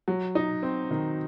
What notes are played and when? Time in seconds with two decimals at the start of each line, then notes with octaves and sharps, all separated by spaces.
0.08 F#3
0.35 D#4
0.63 C4
0.91 D#3